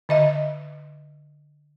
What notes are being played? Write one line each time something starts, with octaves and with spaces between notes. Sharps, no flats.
D3 D#5 E5